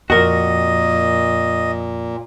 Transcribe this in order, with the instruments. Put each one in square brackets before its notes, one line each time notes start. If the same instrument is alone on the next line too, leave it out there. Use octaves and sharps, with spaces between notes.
[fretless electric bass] F2 [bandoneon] A#2 [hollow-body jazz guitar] F#4 A#4 [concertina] D#5